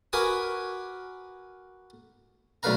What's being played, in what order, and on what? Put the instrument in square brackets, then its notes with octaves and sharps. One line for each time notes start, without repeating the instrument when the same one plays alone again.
[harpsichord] F#4 A#4 B4 G#5 D6 D#6
B1 D3 A3 B4 F5 A#5